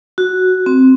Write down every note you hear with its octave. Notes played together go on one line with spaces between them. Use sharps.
F#4
C4